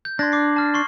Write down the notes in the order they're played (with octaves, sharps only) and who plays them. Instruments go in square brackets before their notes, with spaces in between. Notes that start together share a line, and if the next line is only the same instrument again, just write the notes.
[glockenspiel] G6
[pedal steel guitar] D4 [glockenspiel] C6 G#6 A#6
[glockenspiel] D6 C7
A5 F6
C6 C#6 C7